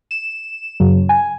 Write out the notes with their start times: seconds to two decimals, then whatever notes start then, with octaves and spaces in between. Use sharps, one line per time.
0.11 E7
0.80 F#2 C#3 F#3
1.09 G#5